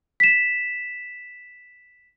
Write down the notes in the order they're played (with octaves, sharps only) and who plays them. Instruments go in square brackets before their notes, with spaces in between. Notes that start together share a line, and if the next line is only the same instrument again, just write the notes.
[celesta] B6 E7